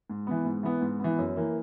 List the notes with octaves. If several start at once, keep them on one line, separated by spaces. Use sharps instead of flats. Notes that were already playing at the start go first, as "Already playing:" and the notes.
G#2
E3 B3
G#2
E3 B3
G#2
E3 B3
F#2
E3 A#3